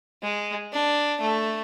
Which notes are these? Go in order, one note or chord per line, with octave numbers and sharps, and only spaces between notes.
G#3
D4
A3